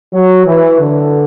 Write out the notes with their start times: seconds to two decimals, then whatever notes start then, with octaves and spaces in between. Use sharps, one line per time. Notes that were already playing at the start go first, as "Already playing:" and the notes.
0.14 F#3
0.46 E3
0.80 D3